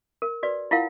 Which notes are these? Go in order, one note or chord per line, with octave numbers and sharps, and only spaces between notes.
A#4
F#4 B4 D5
E4 F4 A#4 F5 F#5